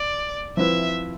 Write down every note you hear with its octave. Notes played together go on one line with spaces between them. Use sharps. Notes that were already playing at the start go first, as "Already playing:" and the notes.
Already playing: D5
F3 C4 E4 B4 E5